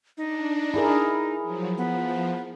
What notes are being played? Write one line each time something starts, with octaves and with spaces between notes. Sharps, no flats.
D4 D#4
E4 G#4 A#4
F3 F#3
F3 B3